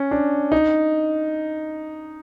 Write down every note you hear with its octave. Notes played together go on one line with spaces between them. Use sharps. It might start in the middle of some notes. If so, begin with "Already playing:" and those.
Already playing: C#4
D4
D#4